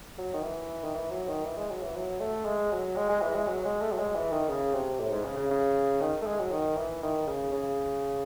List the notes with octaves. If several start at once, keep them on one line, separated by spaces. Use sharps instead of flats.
F#3
D#3
E3
D#3
E3
F#3
D#3
E3
G#3
F#3
E3
F#3
A3
G#3
F#3
G#3
G#3
E3
G#3
F#3
G#3
A3
F#3
G#3
E3
D#3
C#3
C3
A2
G#2
C#3
C#3
C#3
D#3
A3
G#3
F#3
D#3
E3
D#3
C#3
C#3